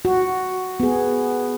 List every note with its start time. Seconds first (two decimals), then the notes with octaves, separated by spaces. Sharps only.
0.05 F#4
0.80 B3 G#4